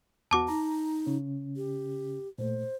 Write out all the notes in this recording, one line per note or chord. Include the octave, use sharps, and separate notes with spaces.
E2 B3 F#4 A5 D6
D#4 A#5
C#3 C#4
G4
A#2 A3 C5